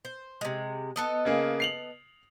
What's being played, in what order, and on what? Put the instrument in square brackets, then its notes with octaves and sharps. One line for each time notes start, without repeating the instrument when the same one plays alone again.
[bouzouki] C5
C3 G#3
B3 A4 D#5
[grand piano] C#3 A#3 G#4
C7 F7 F#7